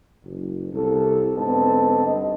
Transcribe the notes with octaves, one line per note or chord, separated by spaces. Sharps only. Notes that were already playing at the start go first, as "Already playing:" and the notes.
F#1
C2 A4
G#2 D3 B3 C4 D#4 A5
G2 D#5